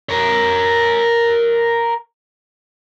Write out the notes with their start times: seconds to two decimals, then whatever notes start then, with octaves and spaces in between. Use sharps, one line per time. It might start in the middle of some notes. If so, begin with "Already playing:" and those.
0.09 A#4 C#5